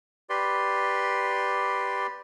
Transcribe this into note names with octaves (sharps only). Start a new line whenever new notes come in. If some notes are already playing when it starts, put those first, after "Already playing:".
G4 B4 D5 C6